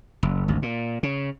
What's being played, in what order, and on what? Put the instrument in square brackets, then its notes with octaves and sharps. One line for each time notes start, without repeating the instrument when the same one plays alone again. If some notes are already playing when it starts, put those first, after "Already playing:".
[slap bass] F#1
G#1 D2
A#2
C#3